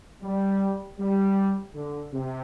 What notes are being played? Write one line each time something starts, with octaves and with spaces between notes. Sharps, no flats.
G3
G3
D3
C3